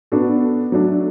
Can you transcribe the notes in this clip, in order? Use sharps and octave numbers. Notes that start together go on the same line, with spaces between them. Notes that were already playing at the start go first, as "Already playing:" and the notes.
B3 D4 F#4 A4
F#3 A3 D4